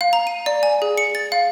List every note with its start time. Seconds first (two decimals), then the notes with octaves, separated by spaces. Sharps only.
0.01 F5
0.13 A#5
0.27 D#7
0.46 D5
0.63 G#5
0.82 G#4
0.98 C#7
1.15 A6
1.32 F5